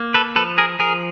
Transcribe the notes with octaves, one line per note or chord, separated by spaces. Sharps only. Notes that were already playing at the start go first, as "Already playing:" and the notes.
Already playing: A#3
A4 B4
F3 A4 B4
G#4 A#4
F3 G#4 A#4